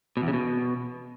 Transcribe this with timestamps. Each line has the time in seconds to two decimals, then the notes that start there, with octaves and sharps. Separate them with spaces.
0.17 B2
0.22 E2
0.28 C#3
0.33 B2